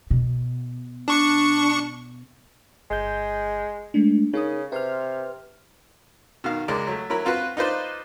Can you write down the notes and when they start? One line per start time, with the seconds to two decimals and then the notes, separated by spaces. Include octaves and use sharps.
0.11 B2
1.08 D4 C#6 C#7
2.91 G1 G#3 G6
3.94 G#3 A3 D4
4.33 C#3 D#4 A#4 D#6
4.72 C3 B4 C6 F6
6.44 B2 D#3 F5
6.68 C#2 G#3 A#4 D5
6.87 F#3 A3
7.10 F#3 E4 A#4 B5
7.25 C4 F4 F#4 B4
7.57 D#4 F4 B4 C5 D5